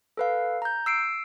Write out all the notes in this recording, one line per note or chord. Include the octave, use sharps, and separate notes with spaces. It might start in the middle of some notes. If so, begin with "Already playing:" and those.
A4 B4 F5
A#5 G6
E6 C7 D7